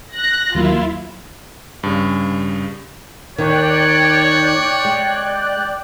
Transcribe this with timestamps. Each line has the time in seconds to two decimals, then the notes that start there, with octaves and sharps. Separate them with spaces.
0.15 F#6 A#6
0.55 D#2 F#3 A#3 E4 F4
1.83 G2 C#3
3.38 D#2 D#3 C#5 D5 G5 F#6
4.85 G#3